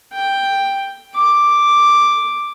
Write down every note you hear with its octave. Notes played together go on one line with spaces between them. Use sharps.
G5
D6